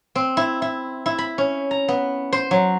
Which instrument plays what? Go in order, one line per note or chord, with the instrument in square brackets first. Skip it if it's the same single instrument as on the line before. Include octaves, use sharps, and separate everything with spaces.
[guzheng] C4
E4
E4
E4
B5
C#4
A#5
B3
C5
F#3